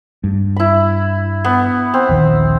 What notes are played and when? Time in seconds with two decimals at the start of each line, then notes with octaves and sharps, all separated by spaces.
0.24 G2
0.56 E4 B5
1.44 B3
1.94 C4
2.09 A#1 D#2 D#3